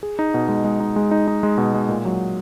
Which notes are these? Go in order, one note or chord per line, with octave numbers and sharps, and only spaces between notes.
G#4
D#4
B2
G#3
G#3
D#4
G#3
D#4
D#4
G#3
B2
G#3
A#2
F#3